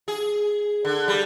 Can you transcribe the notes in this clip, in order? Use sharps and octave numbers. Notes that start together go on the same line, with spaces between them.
G#4
D3
G3